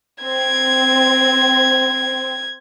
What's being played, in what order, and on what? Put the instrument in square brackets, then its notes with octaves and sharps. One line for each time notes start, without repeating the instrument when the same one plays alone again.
[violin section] C4 [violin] G#6